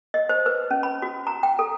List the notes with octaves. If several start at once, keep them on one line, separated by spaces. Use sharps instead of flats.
D#5
C5
B4
C#4
B5
F#4
A#5
G5
A4